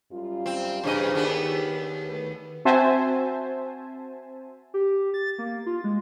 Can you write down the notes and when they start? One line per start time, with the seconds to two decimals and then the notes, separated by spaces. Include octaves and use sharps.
0.12 F#2 G3 F4
0.46 C4
0.84 G2 C#3 E3 G#4 C5 D#5
1.14 D#2 B3 D4 G4 G#4
2.05 D2 A3 B4
2.65 C4 F#4 C5 E5 G#5 A5
4.74 G4
5.14 A6
5.38 A#3
5.66 F4
5.84 G#3